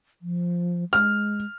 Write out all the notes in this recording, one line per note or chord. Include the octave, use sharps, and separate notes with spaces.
F3
G#3 F6